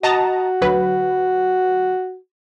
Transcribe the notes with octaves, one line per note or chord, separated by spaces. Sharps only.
F#4 D#5 A5 A#5
D2 F#3 B4